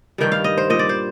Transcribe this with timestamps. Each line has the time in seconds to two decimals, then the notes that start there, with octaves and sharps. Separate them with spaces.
0.18 G2 D#3 G3 G5
0.32 F5
0.44 D#5
0.57 C5
0.70 A#2 G3 D#5
0.79 D5
0.89 C5